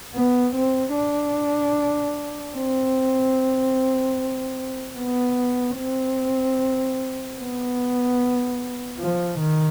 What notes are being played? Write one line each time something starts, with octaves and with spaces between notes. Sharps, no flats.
B3
C4
D4
C4
B3
C4
B3
F3
D#3